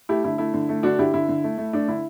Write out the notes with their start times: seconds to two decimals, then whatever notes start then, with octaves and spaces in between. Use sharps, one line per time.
0.09 A3 E4 G4
0.24 D3 E4
0.38 A3 E4
0.54 D3
0.69 A3
0.83 D3 D4 F#4
0.99 D3 E4 G4
1.14 D3 E4
1.29 D3
1.44 A3
1.58 A3
1.73 A3 D4
1.88 D3 E4